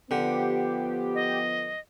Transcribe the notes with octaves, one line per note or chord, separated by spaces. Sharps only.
D3 F3 B3 G4
D#5